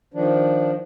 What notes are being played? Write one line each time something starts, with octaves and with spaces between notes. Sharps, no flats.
D#3 F3 D4